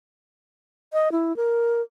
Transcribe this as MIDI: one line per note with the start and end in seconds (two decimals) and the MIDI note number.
0.93 1.11 75
1.12 1.36 64
1.37 1.82 70